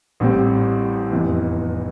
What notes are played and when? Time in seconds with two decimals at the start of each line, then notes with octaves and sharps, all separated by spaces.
0.20 A1 A2 G3 C4
1.11 F1 E2 C3 E3